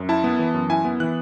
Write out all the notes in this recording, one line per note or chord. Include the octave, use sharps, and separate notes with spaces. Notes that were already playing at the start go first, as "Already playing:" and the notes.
Already playing: F#2
E4 A5
B3
E3
F#2
E4 G#5
B3
E3 F#6